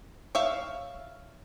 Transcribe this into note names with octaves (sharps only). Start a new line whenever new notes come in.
C#5 E5 F5